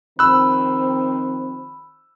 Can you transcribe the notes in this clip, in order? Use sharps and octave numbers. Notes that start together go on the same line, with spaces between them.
D#3 F3 C4 B5 E6 F#6